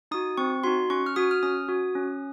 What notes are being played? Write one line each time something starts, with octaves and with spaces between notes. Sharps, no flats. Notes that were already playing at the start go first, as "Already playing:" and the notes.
D#4 F#4 D#6
C4 C#6
D#4 F#4 C6
C#4 C#6
F6
F#4 D#6
F6
C#4 D#6
F#4
C#4